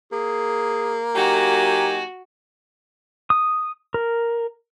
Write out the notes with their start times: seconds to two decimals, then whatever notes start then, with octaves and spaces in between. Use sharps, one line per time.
0.12 A#3 G#4
1.16 F#3 D#4 F#4 G4 G#5
3.30 D#6
3.94 A#4